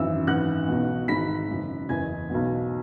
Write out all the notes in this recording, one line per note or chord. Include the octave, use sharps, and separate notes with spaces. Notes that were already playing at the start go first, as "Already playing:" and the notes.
Already playing: G#1 F#2 E3 E5 E6
G#1 F#2 E3 F#5 F#6
B1 B2
G#1 G#2 E3 B5 B6
F#1 F#2 E3
F#1 E2 E3 G#5 G#6
B1 B2